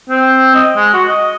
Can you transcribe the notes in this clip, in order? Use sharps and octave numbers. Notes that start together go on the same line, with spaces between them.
C4
D#5
G#3
F#4
D#5